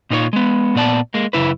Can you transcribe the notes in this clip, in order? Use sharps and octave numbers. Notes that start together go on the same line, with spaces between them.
A#2 D#4 F4 C5 C#5
G#3 B3
A#2 B3 D5 A5
G#3 A#3
F#2 C#3 E4 B4